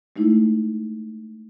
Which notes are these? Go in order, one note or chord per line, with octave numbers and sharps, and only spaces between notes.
G#3 A3 D#4 E4